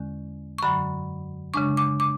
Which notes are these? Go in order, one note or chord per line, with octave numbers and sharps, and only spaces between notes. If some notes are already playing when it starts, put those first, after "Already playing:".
Already playing: E2 D3 G#3 C#4
C#6
F#2 D3 F#3 B5
C#3 G#3 D4 C#6
D6
D6